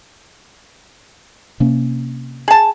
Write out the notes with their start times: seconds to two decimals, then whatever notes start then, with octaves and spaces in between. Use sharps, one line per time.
1.60 C3 A#3 C#4
2.48 G#4 A5